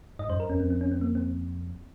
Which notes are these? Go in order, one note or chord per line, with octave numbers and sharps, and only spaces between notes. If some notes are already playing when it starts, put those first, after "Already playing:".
G#2 D#5
F#2 C5
A#4
F2 C#4
F2 C4
C4
C#4
C4
A#3
C4